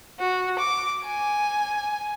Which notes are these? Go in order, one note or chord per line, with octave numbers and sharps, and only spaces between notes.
F#4
D6
G#5